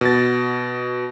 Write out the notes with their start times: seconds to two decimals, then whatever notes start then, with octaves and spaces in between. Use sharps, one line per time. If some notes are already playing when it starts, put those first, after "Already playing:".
0.01 B2 A6